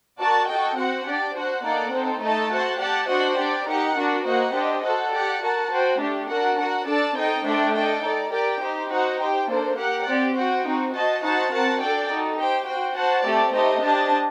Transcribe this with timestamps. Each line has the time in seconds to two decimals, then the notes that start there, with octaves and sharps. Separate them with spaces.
0.18 F#4 A#4 D5 A5
0.48 F#4 A4 D#5 G5
0.77 C4 F#4 C5 F#5
1.06 D4 G4 D5
1.35 F#4 C5 F#5
1.64 A#3 D#4 A4 D5 F#5
1.93 C4 D#4 A4 C5
2.22 A3 D#4 A4 D#5 A5
2.51 F#4 C5 F#5 A5
2.80 G4 D5 F#5 A5
3.08 D4 F#4 C5 D#5 F#5
3.38 D4 G4 D5
3.67 D#4 G4 A#4 F#5
3.96 D4 F#4 A#4
4.25 A#3 F#4 C5 D#5 F#5
4.54 D4 G4 C5 D#5
4.83 F#4 A4 C5 F#5
5.12 G4 D5 F#5
5.41 F#4 A#4 F#5 A5
5.70 F#4 C5 G5
5.98 A3 D4 G4
6.28 D4 F#4 A#4 F#5
6.57 F#4 A#4 F#5
6.86 D4 A4 D5 A5
7.15 C4 D#4 A4 D#5 G5
7.44 A3 D4 A4 C5 G5
7.73 D4 A4 D#5 G5
8.02 D#4 A4 D5
8.31 G4 A#4 D5 G5
8.60 D#4 G4 C5
8.89 D#4 F#4 C5 F#5
9.18 G4 C5 G5
9.47 A#3 D4 A4 C5
9.76 G4 A#4 F#5
10.05 C4 G4 D5
10.34 F#4 C5 G5
10.64 C4 D#4 F#4
10.92 F#4 C5 D#5 A5
11.21 D#4 F#4 C5 F#5 A5
11.50 C4 F#4 A#4 F#5 A5
11.79 D4 A4 D5 G5
12.09 D#4 F#4 A4
12.37 G4 C5 G5
12.66 F#4 C5 G5
12.95 F#4 C5 F#5 A5
13.24 A3 C4 G4 D5
13.53 A3 D#4 G4 C5 D#5
13.83 D4 G4 C5 D#5 A5